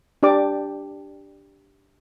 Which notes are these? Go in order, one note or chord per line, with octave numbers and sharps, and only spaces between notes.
D4 G4 D5 D6